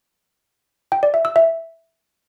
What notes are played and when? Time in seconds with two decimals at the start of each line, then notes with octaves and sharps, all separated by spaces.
0.92 G5
1.03 D5
1.14 E5
1.25 E6
1.36 E5